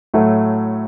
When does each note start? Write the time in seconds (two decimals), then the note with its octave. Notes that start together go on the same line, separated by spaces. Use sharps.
0.14 A2 F#3 A3